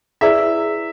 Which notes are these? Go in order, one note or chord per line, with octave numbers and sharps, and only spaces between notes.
E4 G#4 B4 D5 E5